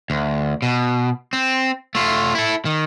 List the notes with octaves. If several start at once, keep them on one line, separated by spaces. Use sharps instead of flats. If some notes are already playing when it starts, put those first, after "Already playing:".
D2
B2
C4
A3 F4
E4 A4
D#3